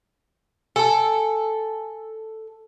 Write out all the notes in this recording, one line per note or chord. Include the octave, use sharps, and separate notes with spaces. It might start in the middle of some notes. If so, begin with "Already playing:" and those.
A4 G#5 A5